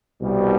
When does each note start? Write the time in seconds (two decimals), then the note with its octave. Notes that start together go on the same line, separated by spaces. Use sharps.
0.22 C2 B2 G3